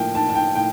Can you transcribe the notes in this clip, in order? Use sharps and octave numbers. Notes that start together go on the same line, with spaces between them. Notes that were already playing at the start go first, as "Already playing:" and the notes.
Already playing: A2 F3 A#3 G5
A5
A5
G5
A2 G5